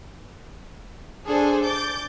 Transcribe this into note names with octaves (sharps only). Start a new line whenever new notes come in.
D4 G#4 A4 C5
D6 G6 A6